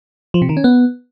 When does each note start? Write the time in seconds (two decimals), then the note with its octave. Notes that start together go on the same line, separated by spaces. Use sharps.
0.34 F3
0.42 C3
0.49 D#3
0.57 C#4
0.64 B3